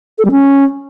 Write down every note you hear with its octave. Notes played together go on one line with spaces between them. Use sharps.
A4
G3
C#4